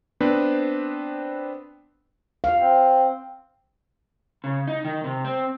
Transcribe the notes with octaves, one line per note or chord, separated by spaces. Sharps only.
B3 C4 D4 B4 C5
F5
C4
C#3
D#4
D#3
C3
C4